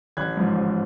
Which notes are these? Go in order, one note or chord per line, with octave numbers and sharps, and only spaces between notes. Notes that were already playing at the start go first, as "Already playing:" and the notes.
A1 F#6 G#6
G#2 F3
A1